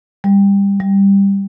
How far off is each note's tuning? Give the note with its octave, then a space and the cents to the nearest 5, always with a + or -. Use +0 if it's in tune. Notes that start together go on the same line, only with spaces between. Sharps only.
G3 +25
G3 +10